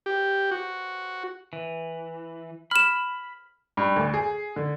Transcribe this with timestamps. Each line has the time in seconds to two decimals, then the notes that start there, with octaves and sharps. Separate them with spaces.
0.06 G4
0.51 F#4
1.53 E3
2.71 B5 F6 E7
3.77 G2
3.96 D2
4.14 G#4
4.56 D3